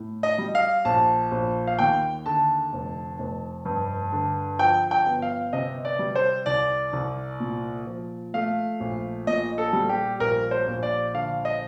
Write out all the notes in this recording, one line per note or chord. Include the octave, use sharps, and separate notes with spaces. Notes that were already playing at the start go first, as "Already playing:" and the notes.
Already playing: A2
D#5
G3
F5
A#1 A5
A#1
F5
D#2 G5
D3 A5
F1
F1
G2
D3
F3 G5
G5
G1
F5
C3 D#5
D5
G3
C5
C2 D5
C2
A#2
F3
A3 F5
A#1
A#2 D#5
A4
G3
G4
A#1 A#4
C5
A#1
D5
D3 F5
D#5